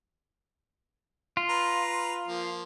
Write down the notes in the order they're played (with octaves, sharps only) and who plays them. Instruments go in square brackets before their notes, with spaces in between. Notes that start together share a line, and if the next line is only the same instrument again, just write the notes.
[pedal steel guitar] F4
[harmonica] B4 A#5
F3 A#3